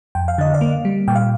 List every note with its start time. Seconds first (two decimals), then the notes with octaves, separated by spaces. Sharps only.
0.15 F2 G5
0.28 F5
0.38 D3 D#5
0.54 D5 F5
0.61 A#3
0.85 G3
1.08 A#2 G5
1.15 F5